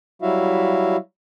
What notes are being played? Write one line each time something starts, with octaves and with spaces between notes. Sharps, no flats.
F#3 G3 E4 F#4 E5 F5